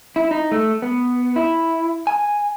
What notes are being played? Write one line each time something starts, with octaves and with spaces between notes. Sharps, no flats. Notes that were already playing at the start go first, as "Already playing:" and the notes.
E4
D#4
A3
B3
E4
G#5